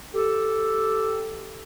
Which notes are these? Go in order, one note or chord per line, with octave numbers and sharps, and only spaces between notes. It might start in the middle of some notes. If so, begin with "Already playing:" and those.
G4 A4